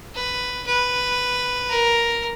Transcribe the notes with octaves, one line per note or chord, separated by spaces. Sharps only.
B4
B4
A#4